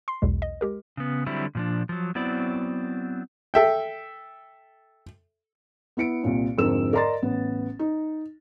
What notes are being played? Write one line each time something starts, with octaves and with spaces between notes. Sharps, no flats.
C6 C7
B1 E2 B2 G#3
D#5
G#3 G4 A#4
C#3 B3
D3 F#3 G3 C4 E4
A#2 F3 D4
F3 F#3
F#3 B3 C4 E4 D5
A4 E5 G5
B3 E4 C#7 D7
C2 A#2
F2 G#2 D3 A#4 E6 E7
A#4 D5 D#5 A#5 C6 A6
A1 B3
D#4